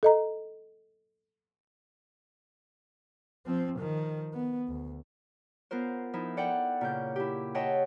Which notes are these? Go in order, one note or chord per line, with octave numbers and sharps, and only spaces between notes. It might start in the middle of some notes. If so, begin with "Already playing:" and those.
A4 D#5 A#5
F3 C4
D#3 F3
B3
D2
B3 F4 A#4 C5
F3 D#4 E4
A4 D5 F#5 G5
A#2 C#3 G6
E4 G4
C#5 D#5 E5 F#5 G5 A5